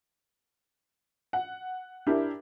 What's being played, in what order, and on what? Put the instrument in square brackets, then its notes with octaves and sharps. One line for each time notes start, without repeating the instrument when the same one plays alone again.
[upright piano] F#5
D4 E4 G4 A#4